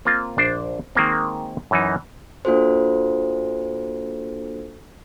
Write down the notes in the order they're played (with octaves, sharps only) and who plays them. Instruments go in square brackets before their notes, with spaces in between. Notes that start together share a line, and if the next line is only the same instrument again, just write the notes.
[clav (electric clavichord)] A#3 C4 F4
A#1 D4 C5
D#3 G#3 A#3 C4
F#2 E3 D#4
[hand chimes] A#3 D4 F4 F#4 A4 C5